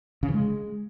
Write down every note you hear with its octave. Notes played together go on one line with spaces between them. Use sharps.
C#3
E3
G#3